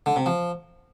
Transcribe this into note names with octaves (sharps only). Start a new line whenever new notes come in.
D3
C3
F3